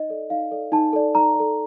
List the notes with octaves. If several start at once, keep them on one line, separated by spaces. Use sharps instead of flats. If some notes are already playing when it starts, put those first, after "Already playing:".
Already playing: D#4 D#5
A4 D5
D#4 F5
A4 D5
D#4 A5
A4 D5
D#4 A#5
D5
A4